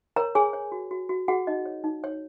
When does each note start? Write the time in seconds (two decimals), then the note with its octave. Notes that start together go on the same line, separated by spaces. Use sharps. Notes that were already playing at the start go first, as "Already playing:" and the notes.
0.16 A#4 C#5 A#5
0.35 G#4 C#5 G#5
0.53 C#5
0.72 F#4
0.91 F#4
1.09 F#4
1.28 F#4 G#4 F#5
1.47 D#4 D#5
1.66 C#5
1.84 D#4
2.04 C#5